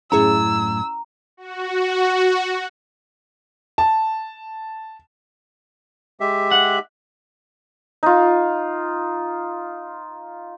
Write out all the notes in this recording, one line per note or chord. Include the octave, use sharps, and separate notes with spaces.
F#2 A2 C#4 E4 G#4 A#5 E6
F#4
A5
G#3 G4 E5
F#5
D#4 F4